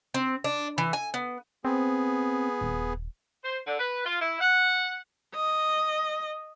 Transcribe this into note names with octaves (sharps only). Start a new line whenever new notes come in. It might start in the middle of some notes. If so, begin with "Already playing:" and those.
C4
D4
E3
G#5
B3
B3 C4 G#4
D#1
C5
D3
B4
F4
E4
F#5
D#5